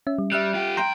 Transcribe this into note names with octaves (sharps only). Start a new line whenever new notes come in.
C#4 E5
G3
G3 E5 F6 F#6
F4 G4
F2 G5 A#5 C6 G6